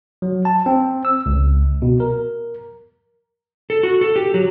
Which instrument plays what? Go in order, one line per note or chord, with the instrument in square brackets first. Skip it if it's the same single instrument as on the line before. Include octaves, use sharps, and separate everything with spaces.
[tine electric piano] F#3
A5
C4
E6
C#2
B2
A#4
[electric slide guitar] A4
F#4
A4
G4
F#3